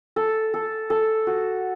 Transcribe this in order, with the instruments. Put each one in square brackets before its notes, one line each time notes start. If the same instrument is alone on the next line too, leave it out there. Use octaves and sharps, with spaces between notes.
[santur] A4
A4
A4
F#4